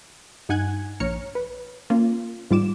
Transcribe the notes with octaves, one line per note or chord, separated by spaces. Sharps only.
G2 D#4 F#5 G#5 F#6 G#6
A#1 C#5 A#5 F6 C#7
B4
A#3 C#4 F4
G#2 G3 F4 D6 E7